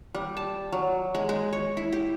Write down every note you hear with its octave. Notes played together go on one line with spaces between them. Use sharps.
G3
A5
F#3
G#3
G#3
C#5
E4
G4